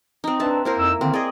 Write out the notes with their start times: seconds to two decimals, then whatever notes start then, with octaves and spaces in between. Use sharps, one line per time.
0.24 C4 D#4
0.40 D4 B4 E5 A5
0.65 A#3 E4 A#4 C5
0.79 F2 D#4 E6
1.01 D3 D#3 A#3 C4
1.14 G#4 D5 D#5